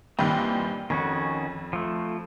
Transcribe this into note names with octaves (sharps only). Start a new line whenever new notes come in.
G2 A#2 D#3 E3 C4
F2 D#3 C#4 F#4
F3 A3